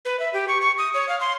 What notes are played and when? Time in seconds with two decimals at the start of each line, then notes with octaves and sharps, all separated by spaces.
0.05 B4
0.19 E5
0.33 G4
0.48 C#6
0.61 C#6
0.78 D#6
0.94 C#5
1.09 F5
1.20 C6